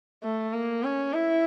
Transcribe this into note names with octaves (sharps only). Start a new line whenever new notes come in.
A3
A#3
C#4
E4